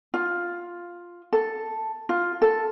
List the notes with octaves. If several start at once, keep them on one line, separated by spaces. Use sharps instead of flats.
F4
A4
F4
A4